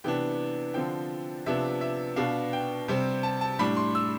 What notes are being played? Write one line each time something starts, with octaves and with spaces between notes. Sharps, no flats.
C3 E3 B3 D4 G5
D3 F3 C4 G5
C3 F3 B3 D4 E5
E5
B2 B3 D4 F5
G5
C3 G3 C4
A5
A5
A2 G3 D4 B5
C6
E6